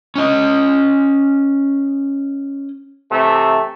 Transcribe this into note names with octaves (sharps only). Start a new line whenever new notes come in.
C#4 D#5
C3 E3 A3